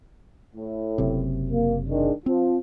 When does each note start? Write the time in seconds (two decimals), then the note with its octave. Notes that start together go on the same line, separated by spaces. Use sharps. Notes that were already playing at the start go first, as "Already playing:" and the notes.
0.55 A2
0.98 F#1 F#2 C3
1.51 A#3
1.90 D#3 G#3 D4
2.26 F3 C4